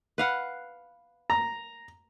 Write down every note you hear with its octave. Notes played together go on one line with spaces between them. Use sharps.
B4 F5 F#5
A#5